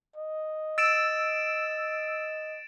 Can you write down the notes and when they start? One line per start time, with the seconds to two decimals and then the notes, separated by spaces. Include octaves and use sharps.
0.16 D#5
0.78 E6 A6 D7 E7